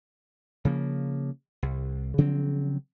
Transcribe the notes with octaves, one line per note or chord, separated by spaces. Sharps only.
C#3 F3 A#3
C2
C#3 F3 F#3 C4